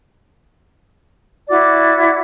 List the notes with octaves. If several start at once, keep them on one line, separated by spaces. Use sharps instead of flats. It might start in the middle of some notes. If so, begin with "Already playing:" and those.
E4 F#4 D5 D6